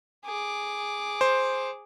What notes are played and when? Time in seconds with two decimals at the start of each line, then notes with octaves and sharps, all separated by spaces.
0.25 G#4 D6
1.21 C5